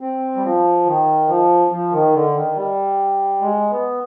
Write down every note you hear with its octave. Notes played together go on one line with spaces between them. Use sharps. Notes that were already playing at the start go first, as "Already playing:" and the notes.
C4
G3
F3
D#3
F3
F3
D#3
D3
D#3
G3
G#3
B3